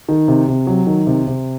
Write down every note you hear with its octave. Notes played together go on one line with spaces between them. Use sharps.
D#3
C3
C3
F#3
D#3
C3
C3